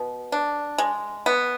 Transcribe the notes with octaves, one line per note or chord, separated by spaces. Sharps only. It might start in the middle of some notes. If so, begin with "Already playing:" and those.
Already playing: B2
D4
G#3
B3